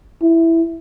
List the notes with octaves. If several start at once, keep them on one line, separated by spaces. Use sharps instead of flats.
E4